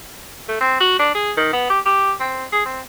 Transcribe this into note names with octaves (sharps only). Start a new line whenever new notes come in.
A3
C4
F#4
D4
G#4
D#3
B3
G4
G4
C4
G#4
C4